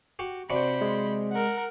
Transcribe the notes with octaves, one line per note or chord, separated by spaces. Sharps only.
F#4 G4
C3 D4 F#4 C5 B5
G#3
A#4 F#5